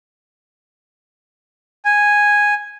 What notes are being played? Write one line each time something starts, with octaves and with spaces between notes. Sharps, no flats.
G#5